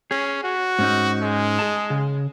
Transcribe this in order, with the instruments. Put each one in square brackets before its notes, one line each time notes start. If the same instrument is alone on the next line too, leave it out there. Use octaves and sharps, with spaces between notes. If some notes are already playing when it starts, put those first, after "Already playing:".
[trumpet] C#4 [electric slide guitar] G#4
[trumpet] F#4
[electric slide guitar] G#2 C#4 D#4
[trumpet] G#3
[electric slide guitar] G#4 A5
C#3